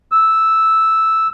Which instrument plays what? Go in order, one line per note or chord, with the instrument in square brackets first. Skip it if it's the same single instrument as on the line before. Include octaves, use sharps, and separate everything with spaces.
[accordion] E6